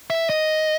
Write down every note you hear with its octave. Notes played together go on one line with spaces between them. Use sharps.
E5
D#5